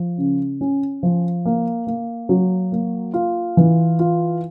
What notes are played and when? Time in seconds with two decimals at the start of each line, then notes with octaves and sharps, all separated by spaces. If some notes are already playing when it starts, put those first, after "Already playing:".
Already playing: F3
0.18 C#3
0.61 C#4
1.03 F3
1.45 A#3
1.87 A#3
2.29 F#3
2.72 A#3
3.14 F4
3.57 E3
3.99 F4